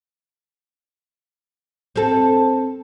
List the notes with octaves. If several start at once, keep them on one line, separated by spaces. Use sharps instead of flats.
C4 A4